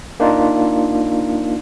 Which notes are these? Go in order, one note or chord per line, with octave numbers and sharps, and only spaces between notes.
A#3 D4 D#4 F4